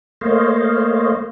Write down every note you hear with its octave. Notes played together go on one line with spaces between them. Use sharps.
A3 A#3 C5 C#5 D#5 F5